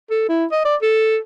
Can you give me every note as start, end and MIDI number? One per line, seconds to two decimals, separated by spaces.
0.11 0.29 69
0.29 0.45 64
0.52 0.62 75
0.65 0.75 74
0.82 1.18 69